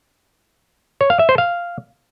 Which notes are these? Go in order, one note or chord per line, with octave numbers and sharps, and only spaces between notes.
C#5
F5
E5
C5
F5